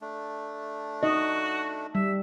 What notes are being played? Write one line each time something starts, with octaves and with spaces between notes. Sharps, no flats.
A3 D4
D#4 F#4 D#5
G3 E5